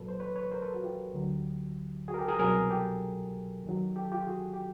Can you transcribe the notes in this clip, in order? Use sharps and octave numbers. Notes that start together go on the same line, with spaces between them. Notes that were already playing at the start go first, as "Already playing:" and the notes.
Already playing: C2 A#2 F#3 A4 B4
C5
B4 C#5
B4 C#5
A#4 C5
A4 B4
F#4
F4 G4
D2 D3 F#3
F#4 G#4
A#4
G4 A4
G#4 A#4
C2 B2 F#3 G#4 A#4
G4 A4
D#2 D#3 F#3
G4 A4
F4 G4
F#4 G#4
G4